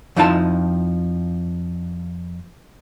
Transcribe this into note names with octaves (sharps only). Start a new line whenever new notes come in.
F2 F3 D#4 E4 F#4 A5